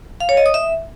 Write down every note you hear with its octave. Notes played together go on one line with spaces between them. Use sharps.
F5
C#5
D#5
D#6
E5